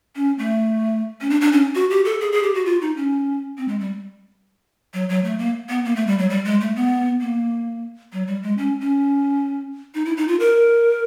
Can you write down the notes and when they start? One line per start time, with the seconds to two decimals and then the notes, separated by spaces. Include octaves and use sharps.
0.16 C#4
0.39 A3
1.21 C#4
1.30 D4
1.41 D4
1.53 C#4
1.75 F#4
1.90 G4
2.05 A4
2.21 G#4
2.32 G#4
2.43 G4
2.54 F#4
2.66 F4
2.81 D#4
2.97 C#4
3.58 C4
3.68 G#3
3.80 G3
4.94 F#3
5.09 F#3
5.24 A3
5.39 A#3
5.69 B3
5.85 A#3
5.96 A3
6.07 G3
6.19 F#3
6.30 G3
6.45 G#3
6.61 A3
6.76 B3
7.21 A#3
8.13 F#3
8.27 G3
8.43 G#3
8.58 C#4
8.81 C#4
9.95 D#4
10.05 E4
10.17 D#4
10.28 F4
10.40 A#4